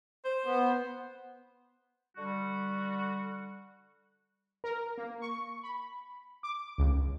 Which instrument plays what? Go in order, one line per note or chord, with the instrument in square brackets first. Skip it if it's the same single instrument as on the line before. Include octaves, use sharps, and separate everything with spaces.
[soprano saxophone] C5
[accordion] B3
[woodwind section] D3 G3 F#4
[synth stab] A#4
A#3
C#6
B5
D6
C#2